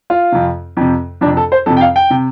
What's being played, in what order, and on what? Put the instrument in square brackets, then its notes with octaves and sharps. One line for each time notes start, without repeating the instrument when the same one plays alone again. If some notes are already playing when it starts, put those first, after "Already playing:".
[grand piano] F4
F2 C3
F2 C3
F2 C3 D4
A4
C5
F2 C3 A4
G5
F5
G5
C3